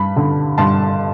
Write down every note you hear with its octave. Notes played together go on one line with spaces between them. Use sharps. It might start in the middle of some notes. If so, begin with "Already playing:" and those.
Already playing: G2 B5
D3
G2 A5 C6